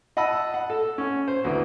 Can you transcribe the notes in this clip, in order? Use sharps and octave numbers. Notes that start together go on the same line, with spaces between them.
D#5 F#5 A5 B5 E6
F#5
A4
C#4
C5
D2 E3